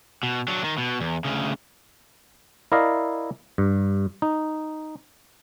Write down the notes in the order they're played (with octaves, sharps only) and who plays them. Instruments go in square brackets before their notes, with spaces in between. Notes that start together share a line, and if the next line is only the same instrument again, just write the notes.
[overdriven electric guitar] B2
F#3 D4
D#3
B2
E2
D2 C#3
[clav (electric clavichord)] E4 A#4 D5 D#5 F5
G2
D#4